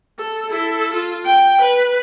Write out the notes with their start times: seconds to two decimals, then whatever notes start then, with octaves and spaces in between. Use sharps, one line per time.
0.19 A4
0.51 E4 A4
0.93 F4
1.25 G5
1.61 B4